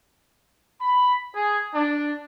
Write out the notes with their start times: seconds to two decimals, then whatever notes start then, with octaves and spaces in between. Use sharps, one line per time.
0.80 B5
1.35 G#4
1.74 D4